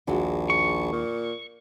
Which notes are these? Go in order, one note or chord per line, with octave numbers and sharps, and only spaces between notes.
A#1 D#2 G#3 F#4
C#6
A#2